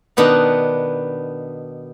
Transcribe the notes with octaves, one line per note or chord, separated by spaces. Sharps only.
B2 D#3 B3 D4 D#4